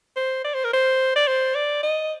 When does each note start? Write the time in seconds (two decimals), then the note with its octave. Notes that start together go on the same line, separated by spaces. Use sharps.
0.16 C5
0.45 D5
0.54 C5
0.64 A#4
0.73 C5
1.16 D5
1.28 C5
1.55 D5
1.83 D#5